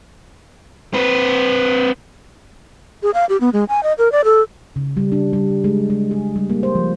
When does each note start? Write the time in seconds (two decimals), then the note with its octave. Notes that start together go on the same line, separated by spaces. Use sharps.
0.94 C4 B4
3.03 G#4
3.14 F5
3.29 G4
3.41 B3
3.53 G#3
3.69 G#5
3.83 D#5
3.98 A#4
4.12 D5
4.24 A4
4.76 C#3
4.97 G3
5.12 D4
5.33 G3
5.64 G#3
5.90 G#3
6.11 G#4
6.36 G3
6.50 A#3
6.63 C5
6.75 F3